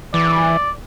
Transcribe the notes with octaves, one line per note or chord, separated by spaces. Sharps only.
E3 D5